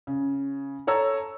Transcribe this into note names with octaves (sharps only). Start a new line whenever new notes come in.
C#3
A4 C#5 A#5 E6